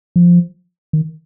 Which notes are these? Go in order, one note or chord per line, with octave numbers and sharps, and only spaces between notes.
F3
D#3